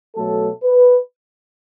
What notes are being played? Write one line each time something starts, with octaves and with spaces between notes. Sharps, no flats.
B2 F#3 A3 A4
B4